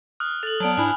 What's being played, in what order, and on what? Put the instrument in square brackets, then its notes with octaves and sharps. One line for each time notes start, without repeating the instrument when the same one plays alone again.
[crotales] D#6 F6 F#6
[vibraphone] A4 [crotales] F7 F#7
[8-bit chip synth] F#3 B3 [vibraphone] D5 A5
[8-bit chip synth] G#2 D4 E4 [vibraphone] G#5 B5